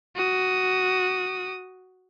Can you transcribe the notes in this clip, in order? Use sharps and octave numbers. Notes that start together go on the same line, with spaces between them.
F#4 D#6